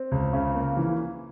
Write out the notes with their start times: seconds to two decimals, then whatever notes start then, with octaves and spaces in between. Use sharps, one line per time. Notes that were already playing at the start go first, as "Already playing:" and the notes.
Already playing: C4
0.11 C#2
0.33 C#3
0.55 A#3
0.77 E3